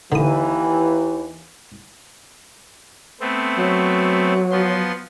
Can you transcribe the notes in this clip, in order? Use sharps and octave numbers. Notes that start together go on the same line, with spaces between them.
D#2 D3 E3 D#6
A3 B3 C4
F#3
F3 B3 C6